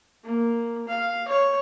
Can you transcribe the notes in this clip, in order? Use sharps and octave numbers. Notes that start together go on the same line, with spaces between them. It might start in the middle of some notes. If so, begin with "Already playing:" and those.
A#3
F5
C#5